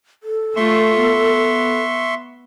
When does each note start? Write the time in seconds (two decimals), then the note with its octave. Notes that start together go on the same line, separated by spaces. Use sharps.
0.23 A4
0.56 A3 F4 E5 C6 C#6
0.99 B3